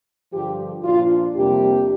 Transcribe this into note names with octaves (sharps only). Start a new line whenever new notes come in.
G2 D3 F3 G4
A#2 F3 D4 F4
F2 C3 G3 A#3 D4 G4